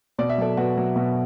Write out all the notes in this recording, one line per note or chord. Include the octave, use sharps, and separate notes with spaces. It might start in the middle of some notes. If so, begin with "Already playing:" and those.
B2 D5
E5
F#3 A4 D5
B2 F#4 B4
F#3
B2 F#4 B4